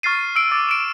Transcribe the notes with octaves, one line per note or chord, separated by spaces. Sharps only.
C#6 F6 A6 C7 D#7
E6 D7
D6 A6
D7 E7